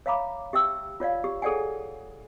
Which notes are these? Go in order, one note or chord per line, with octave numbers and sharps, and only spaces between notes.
C#5 E5 F5 A#5 B5 D6
G4 E5 G5 E6
F4 C#5 D5 F5
G4
G#4 A4 C#5 D5 F#5 G#5